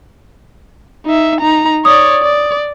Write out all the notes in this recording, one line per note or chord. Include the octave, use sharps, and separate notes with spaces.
D#4 E5
D#4 A#5
C#5 D5 D#6
D5